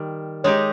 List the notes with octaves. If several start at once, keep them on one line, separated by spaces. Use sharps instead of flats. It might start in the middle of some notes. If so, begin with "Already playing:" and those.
Already playing: D#3 G3
G#3 D#4 G4 C#5